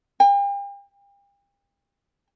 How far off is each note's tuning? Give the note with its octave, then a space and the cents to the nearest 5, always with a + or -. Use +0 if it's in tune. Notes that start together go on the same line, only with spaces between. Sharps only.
G5 +40